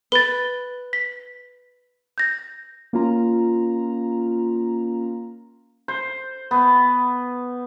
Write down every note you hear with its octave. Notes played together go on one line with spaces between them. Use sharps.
B4 A6 G7
B6
G6 A#6
A#3 C#4 F4 A#5
C5
B3